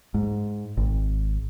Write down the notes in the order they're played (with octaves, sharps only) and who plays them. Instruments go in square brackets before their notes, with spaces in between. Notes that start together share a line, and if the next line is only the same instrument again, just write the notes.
[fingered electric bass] G#2
G#1